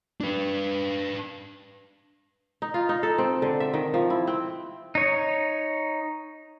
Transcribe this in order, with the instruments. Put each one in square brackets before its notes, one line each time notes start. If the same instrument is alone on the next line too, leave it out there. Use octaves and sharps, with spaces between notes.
[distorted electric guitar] D4 B4
[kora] D#4
F4
D#4
A4
C4
D3
E5
D#3
F3
E4
C4
[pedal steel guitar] D#4 C#5